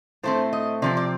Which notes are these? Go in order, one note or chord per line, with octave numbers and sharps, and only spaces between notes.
A2 A3 C4 C5
D#5
C3 F3 C4 D5
D5